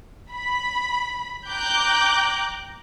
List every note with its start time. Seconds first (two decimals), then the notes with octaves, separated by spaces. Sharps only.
0.33 B5
1.49 G5 A#5 D6 F#6 G6